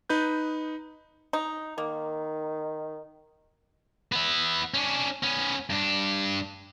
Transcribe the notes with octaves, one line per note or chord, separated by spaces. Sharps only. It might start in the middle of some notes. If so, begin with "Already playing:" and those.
D#4 B4 G6
D#4
D#3 A#3
B3 E4
C#4 D4
B3 C#4
G2 D4